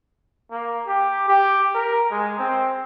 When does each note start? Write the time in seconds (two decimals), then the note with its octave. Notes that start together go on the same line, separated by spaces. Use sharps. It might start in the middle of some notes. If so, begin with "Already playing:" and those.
0.51 A#3
0.87 G4
1.28 G4
1.74 A#4
2.11 G#3
2.39 C4